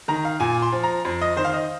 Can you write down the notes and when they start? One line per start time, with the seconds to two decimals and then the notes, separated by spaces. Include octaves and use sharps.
0.08 D#3 A#5
0.25 F5
0.40 A#2 G#5
0.62 C6
0.72 F3
0.84 A#5
1.05 F2
1.21 D#5
1.36 D#3 C5
1.45 F5
1.53 D#5